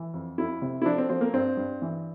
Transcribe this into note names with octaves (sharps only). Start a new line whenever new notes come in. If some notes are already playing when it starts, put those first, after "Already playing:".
Already playing: E3
F2
F2 E4
C3
E4
F3 D4
C4
F3 C4
A#3
G2 C4
G2
E3